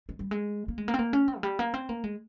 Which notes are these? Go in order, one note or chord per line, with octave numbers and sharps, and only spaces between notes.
G#3
G3
G#3
A#3
G#3
A#3
C4
A#3
C#4
C4
F3
G3
A#3
C4
A#3
G#3